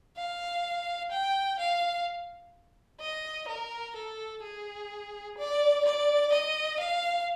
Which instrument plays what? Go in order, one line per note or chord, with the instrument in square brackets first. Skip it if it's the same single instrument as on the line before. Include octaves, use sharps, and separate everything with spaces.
[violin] F5
G5
F5
D#5
A#4
A4
G#4
D5
D5
D#5
F5